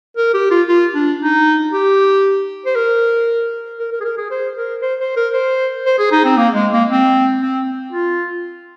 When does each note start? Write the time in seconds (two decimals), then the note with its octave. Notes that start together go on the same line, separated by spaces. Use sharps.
0.17 A#4
0.34 G4
0.51 F4
0.68 F4
0.94 D4
1.20 D#4
1.72 G4
2.66 C5
2.75 A#4
3.79 A#4
3.92 A#4
4.01 G#4
4.05 A#4
4.18 G#4
4.30 C5
4.57 A#4
4.82 C5
5.00 C5
5.17 A#4
5.34 C5
5.86 C5
5.99 G#4
6.12 D#4
6.25 C4
6.37 A#3
6.55 G#3
6.72 A#3
6.90 C4
7.41 C4
7.92 F4